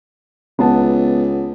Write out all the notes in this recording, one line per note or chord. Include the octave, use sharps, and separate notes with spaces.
C#2 B3 A5